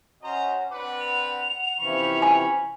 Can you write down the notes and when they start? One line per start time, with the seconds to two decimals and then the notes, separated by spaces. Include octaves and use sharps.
0.23 C#4 F#4 C5 D#5 A#5
0.71 C4 D4 B4 F#5 D6
1.00 F7
1.79 C3 E3 F3 C#4 B5 C#6
2.22 G#5